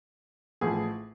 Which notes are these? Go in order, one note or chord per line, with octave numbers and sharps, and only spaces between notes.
A1 A2 F3 G#4